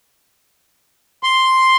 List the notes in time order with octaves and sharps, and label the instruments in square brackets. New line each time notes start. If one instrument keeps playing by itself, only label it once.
[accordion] C6